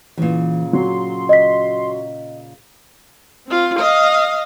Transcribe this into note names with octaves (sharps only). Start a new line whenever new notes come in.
A#2 C#3 E3
F#3 C6
D#5 B6
C4 F4
D#5 F5